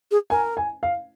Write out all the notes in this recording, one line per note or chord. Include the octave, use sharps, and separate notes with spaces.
G#4
A#4 G#5
G#5
F5